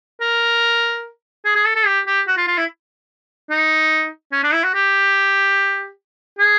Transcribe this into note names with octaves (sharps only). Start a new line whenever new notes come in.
A#4
G#4
G#4
A4
A4
G4
G4
F#4
F4
F4
E4
D#4
C#4
D4
E4
F#4
G4
G#4